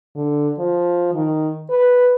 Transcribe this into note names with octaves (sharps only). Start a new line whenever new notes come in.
D3
F3
D#3
B4